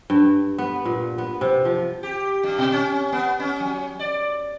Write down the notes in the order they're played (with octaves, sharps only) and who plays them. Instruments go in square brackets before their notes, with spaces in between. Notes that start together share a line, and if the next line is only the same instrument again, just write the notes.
[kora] G2
B3
A#2
B3
C3
F3
[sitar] G4
G2
B2
C#4
B3
C#4
F#3
D5